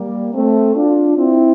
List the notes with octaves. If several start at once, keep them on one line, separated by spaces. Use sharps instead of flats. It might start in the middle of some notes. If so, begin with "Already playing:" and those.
Already playing: G3 A#3
A3 C4
D4 F4
C4 E4